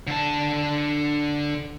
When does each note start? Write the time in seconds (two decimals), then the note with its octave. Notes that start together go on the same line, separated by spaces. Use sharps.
0.07 D3 A5